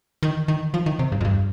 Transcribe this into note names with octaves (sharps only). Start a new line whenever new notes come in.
D#3
D#3
F3
D#3
C3
G2
F2
G2